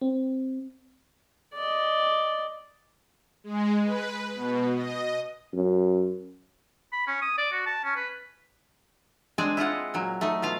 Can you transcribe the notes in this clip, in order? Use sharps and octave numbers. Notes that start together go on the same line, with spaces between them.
C4
D5 D#5
G#3
B4
B2
D#5
F#2
B5
C#4
D#6
D5
F#4
A5
C#4
B4
G#3 C4 D4 G#4 D5
E4 F4 D#5 F#5
A#2 F#3
A3 D#4
B2 F4 F5